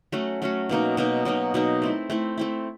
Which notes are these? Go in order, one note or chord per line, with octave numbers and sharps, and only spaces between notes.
F#3 A3 C#4 F#4
F#3 A3 C#4 F#4
B2 F#3 A#3 D#4
B2 F#3 A#3 D#4
B2 F#3 A#3 D#4
B2 F#3 A#3 D#4
A3 C4 E4
A3 C4 E4
A3 C4 E4